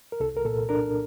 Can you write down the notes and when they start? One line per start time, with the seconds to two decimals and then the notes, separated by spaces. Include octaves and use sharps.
0.12 A#4
0.20 C2 A4
0.36 A#4
0.45 A#2 A4
0.69 D4 A#4